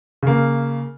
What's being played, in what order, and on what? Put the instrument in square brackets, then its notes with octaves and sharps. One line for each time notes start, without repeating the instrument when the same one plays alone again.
[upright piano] C#3 A#3